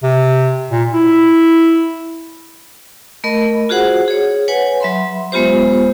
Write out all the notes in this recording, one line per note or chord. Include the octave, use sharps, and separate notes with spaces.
C3
A#2
E4
A3 A#4 D#5 B5
F4 F#4 G#4 C5 F#5
G#4 C#5
B4 C#5 F#5 G#5
F#3 E5 B5 C6
G#3 B3 F4 G4 C5